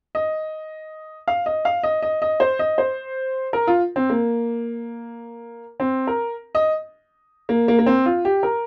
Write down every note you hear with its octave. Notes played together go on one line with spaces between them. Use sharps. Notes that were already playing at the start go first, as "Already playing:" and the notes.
D#5
F5
D#5
F5
D#5
D#5
D#5
C5
D#5
C5
A#4
F4
C4
A#3
C4
A#4
D#5
A#3
A#3
A#3
C4
F4
G4
A#4